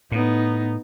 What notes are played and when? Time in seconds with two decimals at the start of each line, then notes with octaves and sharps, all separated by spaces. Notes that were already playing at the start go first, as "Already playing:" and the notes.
0.12 A2 B3 D#4